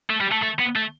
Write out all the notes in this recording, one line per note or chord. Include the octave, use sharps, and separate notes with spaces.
A3
G3
A3
A3
B3
A3